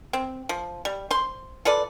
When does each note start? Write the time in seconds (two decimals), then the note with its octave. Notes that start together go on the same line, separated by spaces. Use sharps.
0.13 C4
0.49 F3
0.85 G3
1.11 C5 C6
1.65 F4 A4 B4 D5